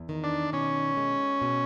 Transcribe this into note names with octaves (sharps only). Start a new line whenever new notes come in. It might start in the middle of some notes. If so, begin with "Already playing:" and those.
Already playing: E2
D#3
D4
B2 C#4
G#3
B2